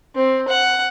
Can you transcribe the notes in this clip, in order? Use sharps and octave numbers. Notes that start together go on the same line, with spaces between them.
C4
F#5